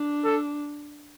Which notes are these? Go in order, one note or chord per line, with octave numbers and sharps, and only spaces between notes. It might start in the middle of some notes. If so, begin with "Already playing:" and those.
Already playing: D4
A4